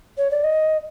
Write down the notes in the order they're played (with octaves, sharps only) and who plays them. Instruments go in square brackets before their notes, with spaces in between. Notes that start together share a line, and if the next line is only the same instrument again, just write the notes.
[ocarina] C#5
D5
D#5